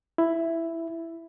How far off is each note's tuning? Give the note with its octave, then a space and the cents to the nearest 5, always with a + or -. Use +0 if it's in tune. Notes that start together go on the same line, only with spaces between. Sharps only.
E4 +5